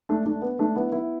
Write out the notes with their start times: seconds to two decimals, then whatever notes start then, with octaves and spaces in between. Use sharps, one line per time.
0.09 A3 D4
0.26 A3 D4
0.42 B3
0.59 A3 D4
0.76 B3 E4
0.92 B3 E4